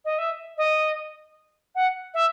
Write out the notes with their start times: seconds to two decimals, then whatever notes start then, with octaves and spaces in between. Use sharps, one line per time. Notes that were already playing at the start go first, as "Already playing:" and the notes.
0.05 D#5
0.18 E5
0.57 D#5
1.75 F#5
2.14 E5